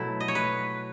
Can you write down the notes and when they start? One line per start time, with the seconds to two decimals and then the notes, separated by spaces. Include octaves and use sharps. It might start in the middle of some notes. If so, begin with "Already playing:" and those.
Already playing: B2 F#3 A3 E4
0.20 D#5
0.28 C#5
0.35 B4